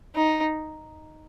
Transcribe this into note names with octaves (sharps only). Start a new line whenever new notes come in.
D#4